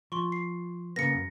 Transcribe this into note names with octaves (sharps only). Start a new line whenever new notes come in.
F3 C6 C#6
C7
C#3 A#3 B3 A#6 C#7
F#2